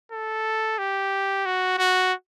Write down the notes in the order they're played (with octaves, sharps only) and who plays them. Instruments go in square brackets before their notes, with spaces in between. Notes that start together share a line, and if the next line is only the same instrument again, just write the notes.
[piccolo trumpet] A4
G4
F#4
F#4